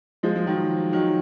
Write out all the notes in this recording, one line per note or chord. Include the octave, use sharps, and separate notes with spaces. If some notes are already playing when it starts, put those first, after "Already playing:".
F3 G#3
F3
D#3 F#3
D#3 F#3